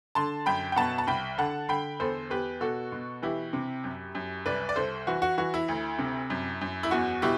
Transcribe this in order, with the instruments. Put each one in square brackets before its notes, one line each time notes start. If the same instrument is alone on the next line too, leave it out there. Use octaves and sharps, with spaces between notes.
[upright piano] D3 A5 C6
F#2 G5 B5
G5
B2 F#5 A5
A5
C2 G5 B5
D3 F#5 A5
D3 G5 B5
E2 A4 C5
E2 G4 B4
B2 F#4 A4
B2
E3 E4 G4
C3
F#2
F#2
C2 B4 D5
D5
C2 A4 C5
E3 F#4
F#4
E3 F#4
E4
D2
C3
F#2
F#2
E4
E2 F#4
B2 E4 G4